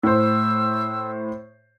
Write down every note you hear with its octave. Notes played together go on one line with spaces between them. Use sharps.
A2 C5 E6